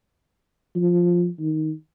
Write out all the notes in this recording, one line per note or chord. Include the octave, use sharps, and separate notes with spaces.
F3
D#3